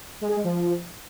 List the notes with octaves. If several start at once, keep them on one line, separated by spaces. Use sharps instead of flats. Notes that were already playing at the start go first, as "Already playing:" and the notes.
G#3
G#4
G#3
F3